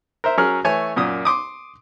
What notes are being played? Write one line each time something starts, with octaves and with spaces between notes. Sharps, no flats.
A#4 C5 E5
F#3 C#4 G#4 A#4 F6
E3 A3 C#5 G#5 C#6
F#2 A#2 D#6
C6 D6 D#6